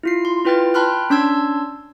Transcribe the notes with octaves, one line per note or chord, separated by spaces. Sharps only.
E4 F4 C7
C6
E4 F4 B4 G5 F6 A6
G5 A5 B5 C6 F6 F#6
C#4 D4 A5 C6 E6 G#6